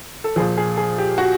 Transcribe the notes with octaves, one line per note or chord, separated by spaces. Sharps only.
A4
A#2 F3 G#4
G#4
G#4
G4
F#4